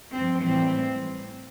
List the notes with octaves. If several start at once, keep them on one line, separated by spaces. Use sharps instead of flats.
G2 F3 C4
A2 E3 G3 C4